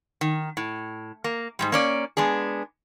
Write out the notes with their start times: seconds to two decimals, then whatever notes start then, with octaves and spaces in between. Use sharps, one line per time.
0.21 D#3
0.57 A2
1.24 A#3
1.59 G#2 C3 G3
1.72 A#3 C#4 D5
2.17 G#3 B3 D4 G#4